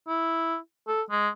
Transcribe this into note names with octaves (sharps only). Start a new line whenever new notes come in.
E4
A4
G#3